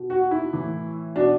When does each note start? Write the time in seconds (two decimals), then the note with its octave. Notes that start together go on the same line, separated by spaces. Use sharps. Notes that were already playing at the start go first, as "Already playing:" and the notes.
Already playing: B2
0.10 F#4
0.31 E4
0.53 A2 E3
1.15 B2 D4